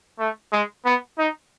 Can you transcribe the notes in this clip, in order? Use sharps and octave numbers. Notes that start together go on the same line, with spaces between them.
A3
G#3
B3
D#4